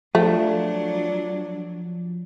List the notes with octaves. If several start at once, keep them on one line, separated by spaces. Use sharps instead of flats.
F3 F#3 A3 D4